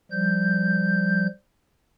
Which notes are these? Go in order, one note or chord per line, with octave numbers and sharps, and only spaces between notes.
F3 G3 G6